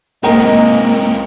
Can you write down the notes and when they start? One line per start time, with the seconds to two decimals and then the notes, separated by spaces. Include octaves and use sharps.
0.23 G#2 C3 G#3 A#3 A#4 D#5 G5 A#5